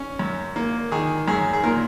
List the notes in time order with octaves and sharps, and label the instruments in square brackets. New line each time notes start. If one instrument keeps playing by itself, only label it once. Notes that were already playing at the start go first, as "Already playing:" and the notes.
Already playing: [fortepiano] C#4
F#2
A#3
D#3 G#4
F#2 G#4
G#4
A#2 A#4